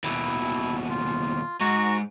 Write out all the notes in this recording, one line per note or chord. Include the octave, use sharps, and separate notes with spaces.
D#2 B2 E4
F4
G#2 F#4 A#5 C#6